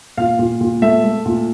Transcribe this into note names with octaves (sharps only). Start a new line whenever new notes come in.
A#2 F5
A#2
A#2
A3 E5
A3
A#2